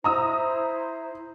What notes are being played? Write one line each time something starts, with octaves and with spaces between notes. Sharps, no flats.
E4 C5 A#5 D#6 E6